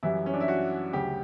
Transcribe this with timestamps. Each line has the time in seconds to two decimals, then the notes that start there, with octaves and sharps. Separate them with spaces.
0.03 F#2 E3 G3 E4
0.26 C#4
0.34 D4
0.41 E4
0.48 F#4
0.93 D2 C#3 F#3 G4